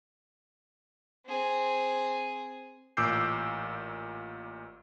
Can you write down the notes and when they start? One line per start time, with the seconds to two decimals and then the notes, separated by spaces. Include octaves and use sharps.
1.26 C4 G#4
2.97 A1 A#2 D6 E6 G6 C7